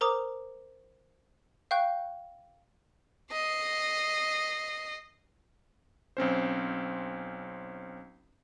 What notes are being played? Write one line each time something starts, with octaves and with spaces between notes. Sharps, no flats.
A#4 C5 A#5 D6 D#6
F5 G5 C#6 F#6 G6
D#5 C7
B1 C4 C#4 C5